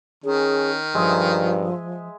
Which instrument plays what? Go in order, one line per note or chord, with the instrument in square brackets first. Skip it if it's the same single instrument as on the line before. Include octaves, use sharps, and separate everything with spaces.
[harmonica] D#3 [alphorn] C#4 [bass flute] G#4
[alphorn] G2 [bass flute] F3 [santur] G#3 E5 D#6